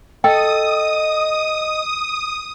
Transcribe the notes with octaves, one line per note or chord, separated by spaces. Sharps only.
A4 D#5 G5 D#6